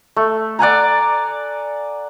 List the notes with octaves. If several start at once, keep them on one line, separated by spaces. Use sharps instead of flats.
A3
D5 F#5 G#5 A#5